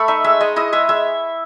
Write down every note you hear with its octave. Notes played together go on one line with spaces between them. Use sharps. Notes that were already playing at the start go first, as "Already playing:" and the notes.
Already playing: A3 B5 C#6
D#4 E5
G#3 E5
G#3 D#5
E4 D#5
G#3 E5
G#3 E5